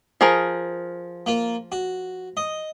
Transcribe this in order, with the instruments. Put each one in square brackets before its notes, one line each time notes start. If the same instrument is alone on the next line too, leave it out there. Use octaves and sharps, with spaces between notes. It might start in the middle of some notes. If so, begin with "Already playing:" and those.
[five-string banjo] F3 G#4 A#4
[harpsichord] A#3 F4
F#4
D#5